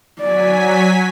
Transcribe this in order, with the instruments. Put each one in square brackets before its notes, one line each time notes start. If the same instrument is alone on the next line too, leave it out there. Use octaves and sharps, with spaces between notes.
[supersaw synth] F#3 G#5 B6 [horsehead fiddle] D5